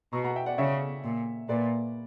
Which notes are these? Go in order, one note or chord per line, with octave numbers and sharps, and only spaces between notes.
B2 A#5 C#6
F#5 A#5
E5 G5
D5 F#5
C#3 C#5 E5
A#2
A#2 B4 D5